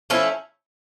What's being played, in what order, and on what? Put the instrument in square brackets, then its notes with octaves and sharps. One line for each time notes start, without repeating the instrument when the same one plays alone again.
[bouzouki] F3 A3 C#4 E4